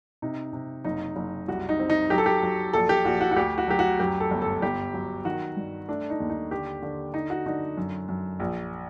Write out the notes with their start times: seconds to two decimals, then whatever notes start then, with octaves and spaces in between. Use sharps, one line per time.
0.22 C3 D#4
0.53 C3
0.84 F#1 D#4
1.16 F#1
1.48 C2 F#4
1.69 D#4
1.79 C4
1.90 D#4
2.10 F#3 G4
2.18 A4
2.26 G4
2.43 F#3
2.73 A#1 A4
2.89 G4
3.05 A#1 F#4
3.21 F#4
3.31 F#4
3.36 D2 G4
3.58 F#4
3.68 F#3 G4
3.79 F#4
4.00 F#2 G4
4.20 A4
4.31 G1
4.42 A4
4.62 G1 G4
4.94 F#3
5.25 D#3 F#4
5.57 G2
5.88 A3 D4
6.10 D#4
6.20 D#2
6.30 D#4
6.51 D3 G4
6.82 D3
7.14 D3 D#4
7.30 F#4
7.46 D3 D#4
7.77 F#2
8.08 F#2
8.40 A#1